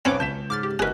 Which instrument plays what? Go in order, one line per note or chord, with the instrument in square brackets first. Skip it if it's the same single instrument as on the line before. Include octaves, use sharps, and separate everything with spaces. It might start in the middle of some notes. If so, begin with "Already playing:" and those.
[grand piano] B1 B4 [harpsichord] C4 C#4 [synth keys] C#5 D6
[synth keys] C#2 [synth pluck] A5 [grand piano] G6 B6 E7
[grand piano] G#2 [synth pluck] D6 F6 A6
[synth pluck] G4
[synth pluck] G1 A#4 [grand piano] D#4 F#4 F#6 [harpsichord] G#4 B4